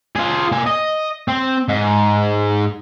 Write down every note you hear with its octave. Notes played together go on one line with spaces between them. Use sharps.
F4 G#4
A#3 G#5
D#5
C4
G#2